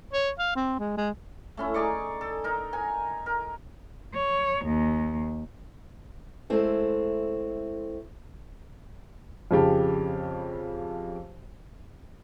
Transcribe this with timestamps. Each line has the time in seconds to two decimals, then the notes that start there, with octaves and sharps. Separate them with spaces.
0.14 C#5
0.39 F5
0.56 C4
0.79 G#3
0.97 G#3
1.57 A3 C#4 E4
1.74 D#4 G#4 D5 C#6
2.21 A4
2.44 D#4 A#4
2.73 A#4 G#5
3.26 A#4
4.14 C#5
4.66 D#2
6.50 G#3 A3 C4 E4
9.51 F2 C#3 G4 A5